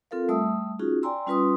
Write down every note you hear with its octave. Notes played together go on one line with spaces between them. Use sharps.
C4 F4 A4 A#4 F5
G3 A3 E5 A5 D#6 E6
C#4 D#4 F4 F#4 G#4
D5 G5 G#5 A#5 C6 E6
G3 C#4 F4 B4 C6 D#6